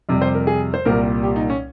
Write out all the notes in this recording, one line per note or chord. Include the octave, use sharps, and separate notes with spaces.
F2 C3 G3
C5
A#4
G#4
C5
C2 A#2 G3 A#4
G4
D#4
C#4